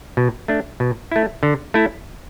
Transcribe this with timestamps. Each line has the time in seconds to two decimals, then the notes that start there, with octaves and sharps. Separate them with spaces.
0.17 B2
0.48 A3 D4
0.80 B2
1.12 A3 E4
1.43 D3
1.74 A3 E4